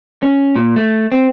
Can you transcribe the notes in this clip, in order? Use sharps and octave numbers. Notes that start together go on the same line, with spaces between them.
C#4
A#2
A3
C4